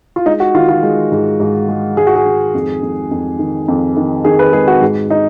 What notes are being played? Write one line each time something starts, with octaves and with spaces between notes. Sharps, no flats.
F4
G#3 D#4
F#4
D#3 F4
F4
G#3
G#2
G#2
G#3
G#2 G#4
F#4
G#4
D#3
F2
F2
F2
D#3
F2
D#3
D#3 G#4
B4
G#3 G#4
F#4
G#2
D#4